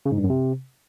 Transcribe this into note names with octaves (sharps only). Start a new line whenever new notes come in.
C#3
G#2
G2
F#2
C3